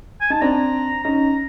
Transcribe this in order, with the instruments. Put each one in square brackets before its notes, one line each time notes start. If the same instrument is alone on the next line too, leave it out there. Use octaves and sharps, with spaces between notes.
[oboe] G#5
[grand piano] D#4 [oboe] A5
[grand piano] C4 D4 [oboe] A#5
[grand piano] C#4 D#4 [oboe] A#5